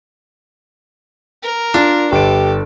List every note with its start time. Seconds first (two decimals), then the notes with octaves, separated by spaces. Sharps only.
1.43 A#4
1.74 D4 F4
2.12 G1 G4 A4 D7